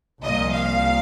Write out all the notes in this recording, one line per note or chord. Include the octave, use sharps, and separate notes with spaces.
C2 A#2 F3 D#5
F5